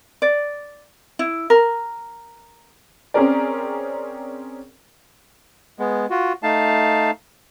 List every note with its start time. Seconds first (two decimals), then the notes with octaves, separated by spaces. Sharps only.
0.22 D5
1.19 E4
1.50 A#4
3.14 C4 C#4 G#4 A#4 D5
5.79 G#3 B3
6.10 F4 F#4
6.43 A3 D#4 F5 A5